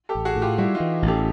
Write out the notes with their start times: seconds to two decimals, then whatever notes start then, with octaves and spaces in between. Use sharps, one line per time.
0.09 G4 A4
0.15 A1
0.25 F#4 G#4
0.36 A2
0.42 F4 G4
0.58 G3 E4 F#4
0.75 D#4 F4
0.80 E3
1.02 A1
1.08 G4 A4